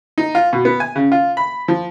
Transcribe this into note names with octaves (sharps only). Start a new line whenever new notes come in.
D#4
F4
B2
B3
G#5
C#3
F4
B5
F3